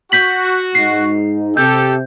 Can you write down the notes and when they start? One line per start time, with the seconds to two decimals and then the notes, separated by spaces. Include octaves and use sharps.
0.12 F#4 G6 B6 F#7
0.75 G#2 D#4 C7
1.57 C3 G4 A4 G6